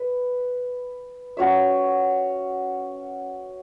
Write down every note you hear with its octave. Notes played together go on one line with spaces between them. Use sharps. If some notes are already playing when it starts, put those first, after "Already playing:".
Already playing: B4
C#4 F#4 C#5 E5